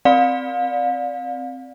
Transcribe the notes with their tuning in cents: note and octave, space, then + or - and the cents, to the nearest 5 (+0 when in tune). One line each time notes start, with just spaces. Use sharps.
C4 +0 D5 +0 F5 +35